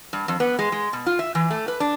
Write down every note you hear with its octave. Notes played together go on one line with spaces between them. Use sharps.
G2
F2
B3
G#3
G#3
B2
F4
E5
E3
A3
B4
D4